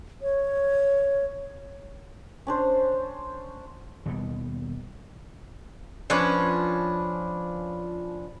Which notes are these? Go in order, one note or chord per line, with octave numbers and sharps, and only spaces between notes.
C#5
C#4 D4 C5
D#2 B2 G3
F3 C#4 D4 B4